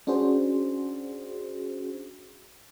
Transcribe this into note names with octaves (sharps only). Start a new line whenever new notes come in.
C#4 D4 F#4 G#4 C5